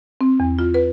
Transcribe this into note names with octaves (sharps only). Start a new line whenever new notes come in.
C4
E2
F4
B4